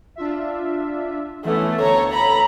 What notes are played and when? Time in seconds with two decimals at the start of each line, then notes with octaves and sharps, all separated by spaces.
0.16 D4 F4 E5
1.45 E3 A3 B3 C#4
1.80 D2 A4 C#5 A#5
2.11 A#5 B5